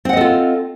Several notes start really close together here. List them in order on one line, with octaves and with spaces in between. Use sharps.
C4 F#5 D#5 A4 F4